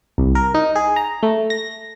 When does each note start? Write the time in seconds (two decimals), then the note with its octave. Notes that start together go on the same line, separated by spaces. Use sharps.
0.18 C2
0.35 A#4
0.54 D#4
0.76 G#4
0.96 A#5
1.23 A3
1.50 A#6